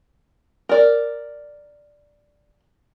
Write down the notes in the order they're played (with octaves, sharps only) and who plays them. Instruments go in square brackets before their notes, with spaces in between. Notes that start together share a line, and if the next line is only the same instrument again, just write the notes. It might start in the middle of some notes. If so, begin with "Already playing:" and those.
[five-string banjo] A#4 D5